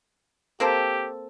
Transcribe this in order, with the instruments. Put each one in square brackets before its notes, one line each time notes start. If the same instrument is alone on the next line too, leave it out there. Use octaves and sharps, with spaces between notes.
[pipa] A#3 C4 A4 [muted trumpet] G4